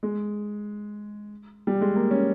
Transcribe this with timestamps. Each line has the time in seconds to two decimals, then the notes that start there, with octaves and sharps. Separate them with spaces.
0.03 G#3
1.67 G3
1.81 G#3
1.96 A#3
2.11 C#4